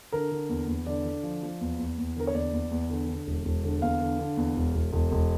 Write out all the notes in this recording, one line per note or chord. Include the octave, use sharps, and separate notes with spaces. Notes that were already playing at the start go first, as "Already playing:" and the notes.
D3 A#4
D3
E2
E2
D3 D5
D3
F3
F3
E2
E2
E2
D3 A#4
C#5
E2 D5
E2
E2
D3
D3
E1
E1
D3
E2 F5
D3
D3
E2
E1
E1
E1
E1